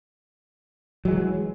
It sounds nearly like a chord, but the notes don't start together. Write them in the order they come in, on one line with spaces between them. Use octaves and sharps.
F#3 G#3 E3